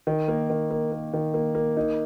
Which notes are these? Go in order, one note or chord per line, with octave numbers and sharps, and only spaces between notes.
D#3
A#3
D#3
A#3
A#3
D#3
A#3
A#3
D#4